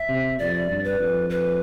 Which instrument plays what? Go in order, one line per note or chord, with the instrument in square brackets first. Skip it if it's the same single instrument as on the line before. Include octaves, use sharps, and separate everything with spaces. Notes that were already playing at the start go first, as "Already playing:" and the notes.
Already playing: [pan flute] E5
[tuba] C3
[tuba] F2 [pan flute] D5
[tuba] G2
[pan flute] B4
[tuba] F2
[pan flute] B4